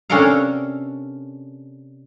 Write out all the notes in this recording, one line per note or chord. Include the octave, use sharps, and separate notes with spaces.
C3 C#4 D4 A4 A#4 F5